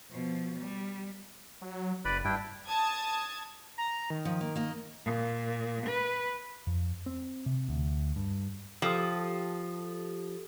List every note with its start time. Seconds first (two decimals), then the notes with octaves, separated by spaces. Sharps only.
0.11 B2 F3
0.59 G3
1.62 F#3
2.05 F#1 B4 D5 B5
2.25 G2 D4 E4 G5
2.68 A5 D#6 G#6
3.78 A#5
4.10 D#3
4.25 F3
4.41 A#3
4.56 A#3 D#5
5.05 A#2
5.87 B4
6.67 F2
7.06 C4
7.46 C3
7.69 D2
8.16 G2
8.82 F3 G4 A4 D#6